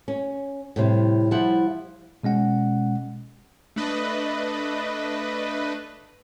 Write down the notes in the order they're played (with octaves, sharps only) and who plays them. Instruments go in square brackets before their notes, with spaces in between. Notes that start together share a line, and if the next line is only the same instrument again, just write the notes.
[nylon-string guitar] C#4
A2 C3 G3
F3 G3 E4 F#5
[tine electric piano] B2 G#3 C#4 F#5
[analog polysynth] A3 D4 B4 D#5